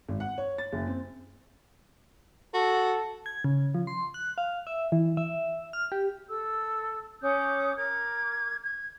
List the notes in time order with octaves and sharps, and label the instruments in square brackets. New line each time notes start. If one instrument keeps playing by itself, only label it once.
[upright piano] G#1
F#5
C#5
A6
F#1
C4
[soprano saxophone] F#4 [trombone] A4
[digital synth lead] G#6
C#3
F3
C6
F#6
F5
E5
E3
E5
F6
G4
[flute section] A4 E6
C#4 D6 D#6 G6
A#4 D6 G#6
G#6